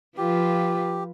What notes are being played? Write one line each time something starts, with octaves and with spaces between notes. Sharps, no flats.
F3 F4 G4 B4